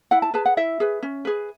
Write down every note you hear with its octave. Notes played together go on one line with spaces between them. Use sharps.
E4 F#5
A5
G#4 B4 A5
F#5
E4 E5
G#4 B4
C#4
G#4 B4